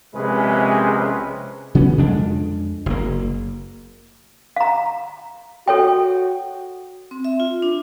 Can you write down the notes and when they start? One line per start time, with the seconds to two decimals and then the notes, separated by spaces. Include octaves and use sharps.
0.14 A#1 C3 G#3 C#4 G#4 B4
1.75 C#3 F#3 B3 C#4
1.98 F2 G#3 D4
2.86 F#1 A#3
4.56 F5 A#5
5.68 F#4 A4 C#5 G5
7.11 C4
7.25 E5
7.40 F4
7.62 D4